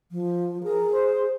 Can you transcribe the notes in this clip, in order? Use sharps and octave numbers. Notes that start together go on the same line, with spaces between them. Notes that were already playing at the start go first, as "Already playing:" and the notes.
F3
G#4 A#4
C5